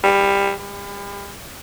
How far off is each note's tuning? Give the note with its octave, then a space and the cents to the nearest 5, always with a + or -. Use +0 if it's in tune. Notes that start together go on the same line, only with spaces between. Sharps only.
G3 +20
G3 +40